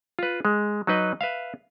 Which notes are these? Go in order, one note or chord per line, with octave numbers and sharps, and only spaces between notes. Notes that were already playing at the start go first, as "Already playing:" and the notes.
F4 B4
G#3
F#3 D#4 B4 D#5
B4 E5 F5